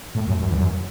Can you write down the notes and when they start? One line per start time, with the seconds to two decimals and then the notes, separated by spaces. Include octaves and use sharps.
0.15 A2
0.27 F#2
0.40 F#2
0.49 E2
0.59 F#2